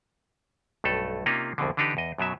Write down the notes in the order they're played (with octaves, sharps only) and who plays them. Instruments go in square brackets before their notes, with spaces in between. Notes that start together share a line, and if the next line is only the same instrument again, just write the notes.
[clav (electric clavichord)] B1 G2 A3 A4
C3 A#3 C#4 D#4 F4
C2 F2 B2 D3
D3 E3 D4 D#4 G4 B4
E2 D#5
F#2 B2 F#3 E5